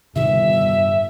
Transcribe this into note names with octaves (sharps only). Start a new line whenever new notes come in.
G1 A2 C3 D#3 E5